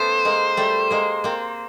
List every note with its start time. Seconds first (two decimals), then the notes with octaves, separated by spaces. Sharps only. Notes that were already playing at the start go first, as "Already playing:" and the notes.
Already playing: A3 B3 C#4 C5
0.25 G#3 A#3
0.57 G3 A3
0.91 G#3 A#3
1.24 A#3 C4